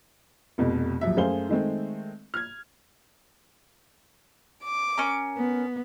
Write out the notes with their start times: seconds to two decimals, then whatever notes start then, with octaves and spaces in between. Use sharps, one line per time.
0.58 F1 F2 B2
1.01 D#1 F3 F#3 E5
1.17 F#2 A3 G#4 C5 F5 G7
1.49 D#3 G#3 A3 C4
2.34 F6 G#6
4.64 D6
4.98 C#4 A#4
5.37 B3